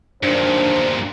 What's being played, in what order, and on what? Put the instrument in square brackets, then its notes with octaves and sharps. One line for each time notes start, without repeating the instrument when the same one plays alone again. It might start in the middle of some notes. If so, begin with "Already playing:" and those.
[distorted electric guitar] G2 A#2 [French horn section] D#3 F#3 D4 [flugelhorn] C5